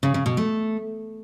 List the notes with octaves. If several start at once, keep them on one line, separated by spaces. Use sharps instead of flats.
C#3
C#3
B2
A3